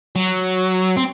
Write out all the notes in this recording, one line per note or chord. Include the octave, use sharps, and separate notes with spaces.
F#3
C4